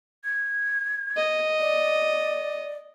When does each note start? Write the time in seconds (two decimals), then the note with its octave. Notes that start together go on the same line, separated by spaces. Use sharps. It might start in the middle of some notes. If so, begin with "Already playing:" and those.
0.24 G#6
1.17 D#5
1.60 D5